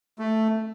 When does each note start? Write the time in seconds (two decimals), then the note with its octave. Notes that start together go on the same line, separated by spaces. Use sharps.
0.19 A3